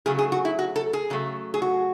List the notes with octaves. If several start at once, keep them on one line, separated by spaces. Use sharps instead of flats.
C#3 F#3 A3 G#4
G#4
F#4
E4
F#4
A4
G#4
C#3 F#3 A3
G#4
F#4